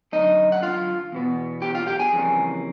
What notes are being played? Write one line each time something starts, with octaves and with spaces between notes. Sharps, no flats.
F#2 D3 F3 A3 D#4 D#5
F#5
F4 F5
E2 B2 B3
G4 G5
F4 F5
G4 G5
G#4 G#5
F2 C#3 E3 G3 A#3